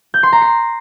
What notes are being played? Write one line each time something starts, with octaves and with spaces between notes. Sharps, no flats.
G6
C6
A#5
C7